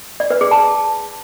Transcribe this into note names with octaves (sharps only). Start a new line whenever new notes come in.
D5
B4
G#4
A5